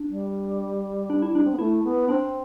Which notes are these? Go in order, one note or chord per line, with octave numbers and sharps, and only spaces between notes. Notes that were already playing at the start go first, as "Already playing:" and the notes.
Already playing: D4
G3
D4
E4
D4
C4
B3
A3 E4
B3
C4 D4